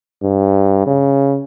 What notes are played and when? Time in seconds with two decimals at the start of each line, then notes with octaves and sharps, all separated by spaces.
0.22 G2
0.87 C#3